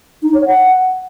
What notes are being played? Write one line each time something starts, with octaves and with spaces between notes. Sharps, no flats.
D#4
C#5
F#5